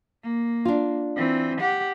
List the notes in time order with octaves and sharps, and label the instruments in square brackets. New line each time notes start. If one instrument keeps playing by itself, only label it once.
[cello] A#3
[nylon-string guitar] D4 F4
[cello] E3 C4
G4 F#5